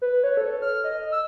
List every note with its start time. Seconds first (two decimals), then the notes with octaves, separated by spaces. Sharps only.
0.02 B4
0.23 C#5
0.37 A4
0.62 F6
0.84 D#5
1.12 E6